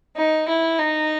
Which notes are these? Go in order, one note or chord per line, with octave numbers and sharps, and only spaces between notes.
D#4
E4
D#4